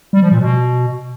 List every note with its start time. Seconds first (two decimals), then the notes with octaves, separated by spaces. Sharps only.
0.13 G3
0.22 F3
0.31 A#2
0.41 B2